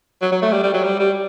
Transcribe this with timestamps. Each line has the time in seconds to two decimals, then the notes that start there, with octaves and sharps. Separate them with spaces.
0.22 F#3
0.32 F#3
0.42 A3
0.52 G3
0.63 G3
0.74 F#3
0.83 G3
1.00 G3